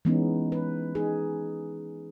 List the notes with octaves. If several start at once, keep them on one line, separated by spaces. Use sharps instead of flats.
E3 G#3 B3 C#4 D#4
B4
D#4 G#4